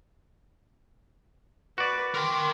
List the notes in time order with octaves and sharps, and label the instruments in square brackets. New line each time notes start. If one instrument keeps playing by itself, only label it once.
[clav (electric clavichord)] F#4 D5 [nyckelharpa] B4
[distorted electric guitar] A#4 G5 [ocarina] C6 [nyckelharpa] D6